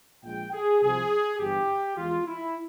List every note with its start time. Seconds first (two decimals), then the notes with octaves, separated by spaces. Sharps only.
0.24 A#1 A#2 G#3 G5
0.52 G#4
0.81 C2 C3 F3 G#4
1.39 G1 G2 E3 G4
1.97 E2 E3 G#3 F4
2.26 E4